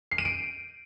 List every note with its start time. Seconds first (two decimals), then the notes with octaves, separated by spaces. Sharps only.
0.11 C7
0.18 D#7
0.25 D7